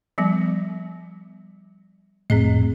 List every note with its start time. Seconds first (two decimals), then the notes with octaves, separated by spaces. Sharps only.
0.18 F3 G3 B3
2.30 C2 F2 A2 C4 G#4 D#5